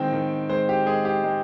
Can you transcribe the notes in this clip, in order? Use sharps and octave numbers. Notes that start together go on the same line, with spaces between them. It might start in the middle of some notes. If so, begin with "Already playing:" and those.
Already playing: D#3 G#3 C4 G5
D#3
G#3 C5
G4
G#3 G#4
G4
G#3